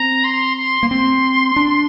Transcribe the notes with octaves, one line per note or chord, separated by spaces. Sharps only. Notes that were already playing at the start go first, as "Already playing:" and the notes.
Already playing: C4 A#5
C6
C6
A#3
C4 C6
D4